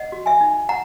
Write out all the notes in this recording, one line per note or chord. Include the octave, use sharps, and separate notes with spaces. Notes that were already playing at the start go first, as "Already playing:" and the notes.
Already playing: D#5 F#5
F#4
E5 G#5
D#4
F#5 A#5